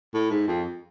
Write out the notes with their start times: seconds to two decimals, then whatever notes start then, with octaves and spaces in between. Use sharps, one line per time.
0.14 A2
0.30 G#2
0.48 F2